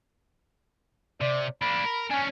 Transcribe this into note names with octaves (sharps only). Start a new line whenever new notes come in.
C3 D5
A#3 D4 B5
A#4
C#4 D4 G#5